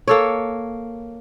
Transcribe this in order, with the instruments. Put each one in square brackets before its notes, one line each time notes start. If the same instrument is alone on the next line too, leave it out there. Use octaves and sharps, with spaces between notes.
[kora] A#3 A4 C#5